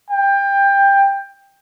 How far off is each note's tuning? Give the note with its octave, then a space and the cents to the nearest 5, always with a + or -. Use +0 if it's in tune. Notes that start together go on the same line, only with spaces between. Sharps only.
G5 +20